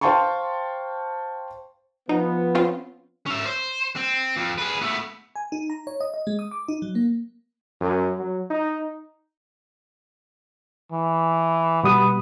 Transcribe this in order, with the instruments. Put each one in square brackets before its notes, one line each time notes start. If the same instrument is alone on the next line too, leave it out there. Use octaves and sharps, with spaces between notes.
[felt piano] C5 F5 G5 A5 C6 C#6
[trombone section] F3 B3 [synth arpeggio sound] D#4
[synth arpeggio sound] C4 C#4 F4
[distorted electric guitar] C#4 E5
C5
C4
F2
G#4 B4
A3 B3
[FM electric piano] G#5
D#4
A#5
C#5
D#5
D#5
G#3
D#6
D6
D#4
F#3
A#3
[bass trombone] F#2
F#3
D#4
[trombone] E3
[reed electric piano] B2 G3 D#6 [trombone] B3